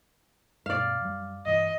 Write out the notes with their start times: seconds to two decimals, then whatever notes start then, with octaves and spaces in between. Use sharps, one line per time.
0.66 G2 B2 D5 F5
1.01 F#2 G3
1.46 G2 E3 D#5